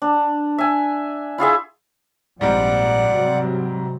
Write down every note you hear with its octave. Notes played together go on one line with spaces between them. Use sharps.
D4
E5 G#5
E4 F4 G#4 E5
A#1 G#2 F3 G3 C4 D5 F#5
C3 F#3